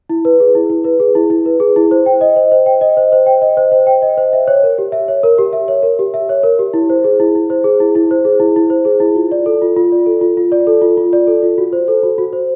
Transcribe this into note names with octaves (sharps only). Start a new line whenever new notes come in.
E4
B4
G#4
E4
E4
B4
G#4
E4
E4
B4
G#4
E4
C5
G5
D#5
C5
C5
G5
D#5
C5
C5
G5
D#5
C5
C5
G5
D#5
C5
E5
C#5
A#4
G4
E5
C#5
A#4
G4
E5
C#5
A#4
G4
E5
C#5
A#4
G4
E4
C5
G#4
E4
E4
C5
G#4
E4
E4
C5
G#4
E4
E4
C5
G#4
E4
F4
D5
A4
F4
F4
D5
A4
F4
F4
D5
A4
F4
F4
D5
A4
F4
F#4
C5
A4
F#4
F#4
C5